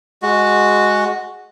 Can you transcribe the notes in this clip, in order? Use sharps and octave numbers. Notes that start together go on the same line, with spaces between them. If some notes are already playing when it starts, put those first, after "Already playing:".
G#3 F#4